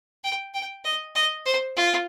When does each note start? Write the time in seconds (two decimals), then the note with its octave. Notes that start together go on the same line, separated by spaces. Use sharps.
0.23 G5
0.54 G5
0.84 D#5
1.15 D#5
1.45 C5
1.76 F4